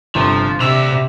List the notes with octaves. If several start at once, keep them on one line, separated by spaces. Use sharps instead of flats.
G1 C3 F3
C3 D4 E5 E6 F7